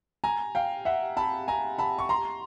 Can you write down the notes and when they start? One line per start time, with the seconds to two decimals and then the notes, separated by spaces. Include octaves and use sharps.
0.24 G#5 A#5
0.55 F5 G5
0.85 E5 F#5
1.17 A5 B5
1.48 G#5 A#5
1.79 A5 B5
1.99 C#6
2.09 A#5 C6